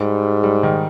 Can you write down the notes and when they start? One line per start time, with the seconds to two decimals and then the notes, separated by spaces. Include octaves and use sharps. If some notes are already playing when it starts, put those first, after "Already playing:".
Already playing: G#2 G3
0.44 G3
0.63 D#3